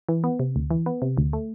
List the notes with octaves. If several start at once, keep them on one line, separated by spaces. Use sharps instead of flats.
E3
B3
C3
D2
E3
B3
C3
D2
A3